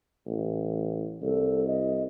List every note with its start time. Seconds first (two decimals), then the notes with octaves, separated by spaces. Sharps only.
0.27 A1
1.22 C2 A4
1.67 D#5